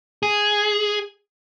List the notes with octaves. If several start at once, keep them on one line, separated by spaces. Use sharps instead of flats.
G#4